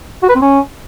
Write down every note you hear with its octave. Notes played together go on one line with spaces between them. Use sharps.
F#4
B4
C4
C#4